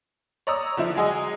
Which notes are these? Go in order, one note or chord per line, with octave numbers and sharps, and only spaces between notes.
C#5 D5 A#5 D#6 E6
D3 F3 E4
F#3 G#3 G#4 D#5